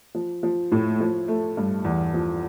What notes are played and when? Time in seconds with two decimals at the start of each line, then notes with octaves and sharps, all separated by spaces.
0.15 F3
0.43 F3
0.72 A2
1.00 F3
1.28 A3
1.57 G2
1.85 E2
2.14 F3